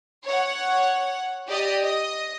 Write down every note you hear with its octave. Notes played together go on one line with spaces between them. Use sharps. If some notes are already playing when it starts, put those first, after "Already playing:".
C#5 F#5
G4 D5 D#5
D#5